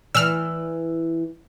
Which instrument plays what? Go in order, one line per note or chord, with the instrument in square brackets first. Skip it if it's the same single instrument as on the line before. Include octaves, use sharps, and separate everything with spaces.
[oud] E3 D5 [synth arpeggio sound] E6 F6